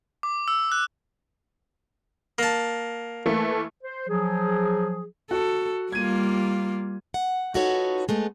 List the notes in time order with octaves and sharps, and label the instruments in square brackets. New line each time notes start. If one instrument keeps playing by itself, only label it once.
[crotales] D6
E6
F#6
[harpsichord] A#3 A5
[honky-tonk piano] E3 A3 A#3
[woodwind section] C5
F3 F#3 G#4
[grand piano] F#4 [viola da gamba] A4
[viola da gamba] G3 A#3 F4 [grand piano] G#6 D#7
[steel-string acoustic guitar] F#5
D#4 F4 F#4 A4 B4 C#5
G#3 A3 B3